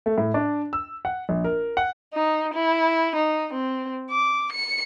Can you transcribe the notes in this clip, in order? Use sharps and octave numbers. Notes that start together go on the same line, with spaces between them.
A3
A2
D4
E6
F#5
A#1
A#4
F#5
D#4
E4
D#4
C4
D6
C#7